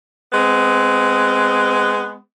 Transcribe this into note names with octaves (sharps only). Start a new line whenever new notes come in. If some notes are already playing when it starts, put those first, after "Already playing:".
G#3 B3 C4